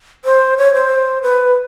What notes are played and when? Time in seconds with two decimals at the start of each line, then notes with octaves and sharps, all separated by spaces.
0.25 C5
0.58 C#5
0.74 C5
1.23 B4